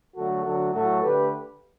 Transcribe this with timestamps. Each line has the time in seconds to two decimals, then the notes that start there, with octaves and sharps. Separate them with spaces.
0.16 D3 F#3 A3 F#4 A4
0.44 D3 F#3 A3 F#4 A4
0.73 A2 F#3 A3 F#4 A4
1.02 D3 A3 G4 B4